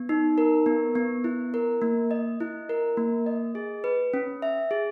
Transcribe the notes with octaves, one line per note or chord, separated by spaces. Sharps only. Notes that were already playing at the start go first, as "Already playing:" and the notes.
Already playing: B3
D#4
A#4
B3
B3
E4
A#4
A#3
D#5
E4
A#4
A#3
D#5
G#4
B4
C#4
E5
G#4